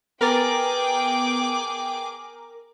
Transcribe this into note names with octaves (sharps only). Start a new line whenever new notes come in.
B3 G#4 A#4 G5 D6 A6